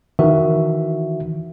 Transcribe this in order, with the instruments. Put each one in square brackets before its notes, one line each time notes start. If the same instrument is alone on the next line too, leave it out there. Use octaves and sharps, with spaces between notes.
[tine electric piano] D#3 E3 F#4 E5